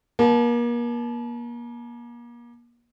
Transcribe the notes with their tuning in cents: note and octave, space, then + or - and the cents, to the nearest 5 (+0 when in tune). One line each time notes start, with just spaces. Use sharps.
A#3 +35 A5 -30